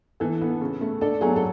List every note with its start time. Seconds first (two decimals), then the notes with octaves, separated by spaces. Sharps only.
0.20 E3 A4
0.41 B3
0.61 C#3
0.81 A3
1.01 D4 A4
1.21 F#3 G#4
1.36 A4